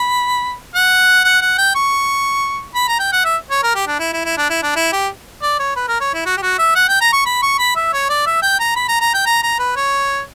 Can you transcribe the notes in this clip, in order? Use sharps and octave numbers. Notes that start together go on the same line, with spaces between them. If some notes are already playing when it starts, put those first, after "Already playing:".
Already playing: B5
F#5
F#5
F#5
G5
C#6
B5
A#5
G5
F#5
E5
C#5
A#4
G4
D4
E4
E4
E4
D4
E4
D4
E4
G4
D5
C#5
B4
A#4
C#5
E4
F#4
G4
F#4
E5
F#5
G5
A#5
C#6
B5
C#6
B5
E5
C#5
D5
E5
G5
A#5
B5
A#5
A#5
G5
A#5
A#5
B4
C#5